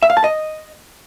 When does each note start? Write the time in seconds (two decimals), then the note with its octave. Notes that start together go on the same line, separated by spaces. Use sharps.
0.03 E5
0.10 F5
0.17 A5
0.24 D#5